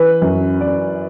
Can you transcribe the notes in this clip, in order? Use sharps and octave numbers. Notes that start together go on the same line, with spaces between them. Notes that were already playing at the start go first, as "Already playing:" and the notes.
Already playing: E3 B4
F#2
F#2 D5